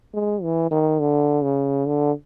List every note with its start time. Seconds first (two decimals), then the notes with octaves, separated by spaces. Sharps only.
0.14 G#3
0.43 E3
0.71 D#3
1.00 D3
1.44 C#3
1.86 D3